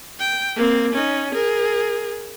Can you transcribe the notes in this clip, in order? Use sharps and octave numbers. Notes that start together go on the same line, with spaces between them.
G5
A#3 C4
C#4 D#4
G#4 A#4